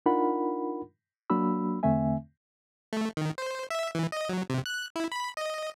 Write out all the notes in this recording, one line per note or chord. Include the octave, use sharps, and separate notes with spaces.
D4 D#4 F4 A#4 F#5 B5
F#3 A#3 D4 F#4 B5 E6
E2 D3 A3 C4 E5 G#5
A3
D#3
C5
E5
E3
D#5
F#3
C3
F#6
E4
B5
D#5